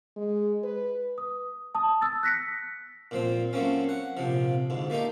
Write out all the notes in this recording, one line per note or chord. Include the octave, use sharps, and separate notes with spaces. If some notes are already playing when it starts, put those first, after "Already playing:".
G#3
B4
D#6
A5 D#6
E6 A6
F#6 A#6 B6 C#7
A#2 F3 C4
F#3 A3 A#3 C4 C#4
F#5
A#1 C3 F3
D2 G#2
A3 A#3 D#4 G4